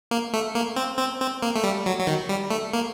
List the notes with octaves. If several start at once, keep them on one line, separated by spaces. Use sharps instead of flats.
A#3
A3
A#3
C4
C4
C4
A#3
A3
G3
F#3
F#3
D#3
G3
A3
A#3